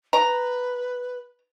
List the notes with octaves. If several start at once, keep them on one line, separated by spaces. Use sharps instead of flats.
B4 A#5